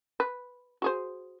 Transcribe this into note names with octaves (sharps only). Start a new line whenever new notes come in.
B4
F#4 G#4 C5